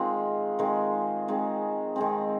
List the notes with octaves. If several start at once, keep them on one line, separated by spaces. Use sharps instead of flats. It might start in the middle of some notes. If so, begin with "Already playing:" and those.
Already playing: D#3 G#3 C4 F4
D#3 G#3 C4
D#3 G#3 C4
D#3 G#3 C4